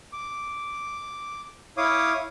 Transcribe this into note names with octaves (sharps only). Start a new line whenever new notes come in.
D6
E4 C#5 F5 D6 D#6